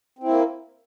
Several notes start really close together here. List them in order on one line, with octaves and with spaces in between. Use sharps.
C4 E4 A#3